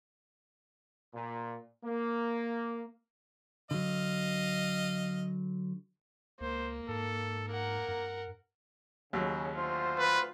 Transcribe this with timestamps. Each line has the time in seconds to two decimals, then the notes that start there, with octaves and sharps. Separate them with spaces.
1.14 A#2
1.85 A#3
3.71 D3 F#3 D#5 F5
6.41 C#2 A#3 C5
6.88 G#2 A4
7.48 A#3 A#4 F#5
7.88 G2
9.13 D#2 C#3 F#3
9.55 D2 F4 C5
9.98 B4